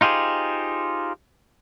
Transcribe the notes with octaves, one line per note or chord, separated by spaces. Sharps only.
D#4 F4 G4 G#4 C5